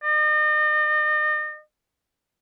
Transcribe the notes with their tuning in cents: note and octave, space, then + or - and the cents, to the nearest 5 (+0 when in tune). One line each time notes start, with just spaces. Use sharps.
D#5 -40